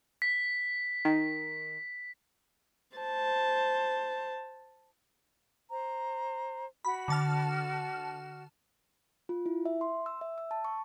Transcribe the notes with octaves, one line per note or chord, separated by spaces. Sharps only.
B6
D#3
C5 A5
C5 A#5
F#4 B5
D3 A5 F6
F4
E4
E5
C6
E6
E5
E6
A5
C#6